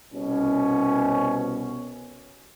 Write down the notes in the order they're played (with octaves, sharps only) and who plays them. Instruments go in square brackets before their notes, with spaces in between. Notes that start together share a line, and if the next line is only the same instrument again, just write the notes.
[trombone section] C2 B2 C#4